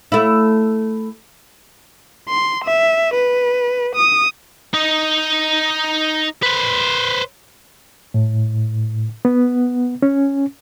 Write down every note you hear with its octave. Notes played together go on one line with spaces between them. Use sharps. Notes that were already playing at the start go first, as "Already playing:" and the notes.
A3 E4
C6
E5
B4
D#6
D#4 D#5
B4 C5
A2
B3
C#4